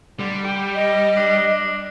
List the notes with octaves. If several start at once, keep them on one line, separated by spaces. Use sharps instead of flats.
D3 G3
G4
D#5
D4